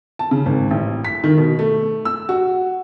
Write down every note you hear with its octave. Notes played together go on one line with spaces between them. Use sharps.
A5
C#3
G#1
A1
B6
D#3
B2
A3
E6
F#4